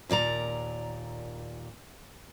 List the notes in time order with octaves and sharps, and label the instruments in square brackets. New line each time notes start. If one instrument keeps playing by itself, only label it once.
[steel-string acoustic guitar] D#2 A#2 D5 A#5